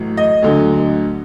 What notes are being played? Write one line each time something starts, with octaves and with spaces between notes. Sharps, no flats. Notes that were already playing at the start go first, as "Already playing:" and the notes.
Already playing: A1 A2 F#3
D#5
D2 D3 F#3